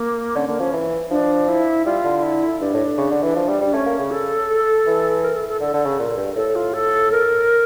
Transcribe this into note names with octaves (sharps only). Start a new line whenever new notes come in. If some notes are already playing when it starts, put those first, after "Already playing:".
Already playing: A#3
D3 C#4
D3 A#3
F3 C#4
E3
F3 D4
E4
G3 F4
D3
E4
G2 D4
A2
C#3
D3
E3
F3
G3
G3
D4
A3 C#4
A#3
C#3
A4
E3
A#4
A4
A4
D3 A4
D3
C#3
A#2
G2
A2 A4
F4
A4
A#4